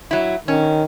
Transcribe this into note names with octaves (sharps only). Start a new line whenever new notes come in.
F#3 E4
D#3 C#4